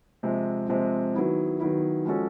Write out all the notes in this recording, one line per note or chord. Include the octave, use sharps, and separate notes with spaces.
C3 F3 G#3 C4
C3 F3 G#3 C4
D#3 F#3 B3 E4
D#3 F#3 B3 E4
F3 G#3 C#4 F#4 A4